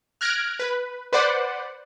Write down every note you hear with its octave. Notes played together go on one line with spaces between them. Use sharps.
F6 F#6 G#6 A#6 D7
B4
B4 C5 D5 F#5